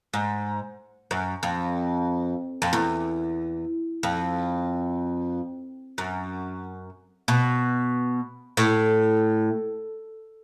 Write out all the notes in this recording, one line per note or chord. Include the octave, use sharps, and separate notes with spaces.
G#2
F#2
F2
F2
E2
F2
F#2
B2
A2